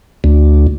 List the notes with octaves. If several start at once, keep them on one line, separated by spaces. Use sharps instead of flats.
D2